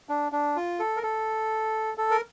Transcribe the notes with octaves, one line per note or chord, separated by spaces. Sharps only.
D4
D4
F4
A4
A#4
A4
A4
A#4